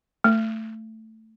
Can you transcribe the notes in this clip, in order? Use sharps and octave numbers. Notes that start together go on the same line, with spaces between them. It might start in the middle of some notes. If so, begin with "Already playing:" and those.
A3